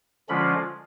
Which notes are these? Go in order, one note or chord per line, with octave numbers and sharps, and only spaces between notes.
D3 F3 G#3 C#4 F4 B5